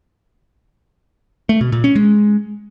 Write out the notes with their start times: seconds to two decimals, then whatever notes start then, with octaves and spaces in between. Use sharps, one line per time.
1.49 A3
1.61 B2
1.72 A#2
1.84 C#4
1.96 G#3